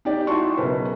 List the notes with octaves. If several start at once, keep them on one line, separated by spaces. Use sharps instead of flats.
D#4 G4 D5
D#4 E4 F#4 A5 C6 C#6
B1 C#3 A#4 B4 E5